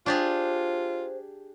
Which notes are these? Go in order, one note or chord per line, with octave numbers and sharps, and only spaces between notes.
D4 F4 G4 G#4 C5